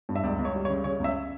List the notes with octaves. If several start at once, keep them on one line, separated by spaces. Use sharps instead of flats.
G2
E5
C#2 D5
C#2
C#5
G3
C#5
C#3
C#3 C#5
C#2 E5